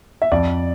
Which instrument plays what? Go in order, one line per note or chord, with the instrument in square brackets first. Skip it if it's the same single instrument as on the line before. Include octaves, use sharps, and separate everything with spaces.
[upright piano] E5
[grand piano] F2 [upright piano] D5